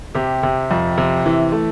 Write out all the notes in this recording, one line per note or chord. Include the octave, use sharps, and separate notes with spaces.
C3 G4
C3
F2
C3
E3
A3